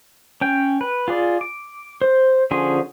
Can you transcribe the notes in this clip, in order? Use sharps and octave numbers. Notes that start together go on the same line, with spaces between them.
C#4 G5
B4
F4 G#4 D5
D6
C5
D3 F3 C#4 G#4 C6